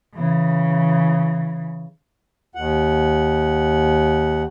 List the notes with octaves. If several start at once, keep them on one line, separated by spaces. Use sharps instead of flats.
C#3 E3
D#2 F#5